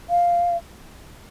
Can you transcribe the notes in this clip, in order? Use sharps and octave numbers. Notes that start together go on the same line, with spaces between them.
F5